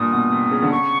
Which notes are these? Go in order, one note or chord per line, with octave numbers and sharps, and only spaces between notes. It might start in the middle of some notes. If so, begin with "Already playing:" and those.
Already playing: G2 A#2 D#6
B2
C3
C#3
D3
C#3 C#6